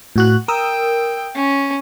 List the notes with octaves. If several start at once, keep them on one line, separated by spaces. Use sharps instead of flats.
A2 F#4 F#6
A#4 G5 D#6 E6
C#4